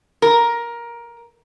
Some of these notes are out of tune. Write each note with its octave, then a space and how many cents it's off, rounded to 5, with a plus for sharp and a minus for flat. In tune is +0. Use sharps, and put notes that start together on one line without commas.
A#4 +15